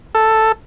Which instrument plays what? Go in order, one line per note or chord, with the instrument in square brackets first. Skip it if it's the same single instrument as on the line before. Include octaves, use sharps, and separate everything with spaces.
[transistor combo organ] A4